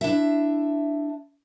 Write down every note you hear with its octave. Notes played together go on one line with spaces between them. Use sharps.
D4 E4 E5